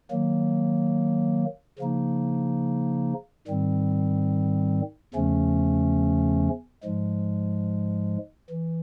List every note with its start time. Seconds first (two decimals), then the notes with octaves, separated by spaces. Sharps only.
0.11 D#3 F#3 A#3
1.79 C#3 F3 A#3 D#4
3.47 G#2 D#3 G3 C4
5.14 E2 C#3 F3 A3 C#4
6.83 G#2 F3 G#3
8.50 E3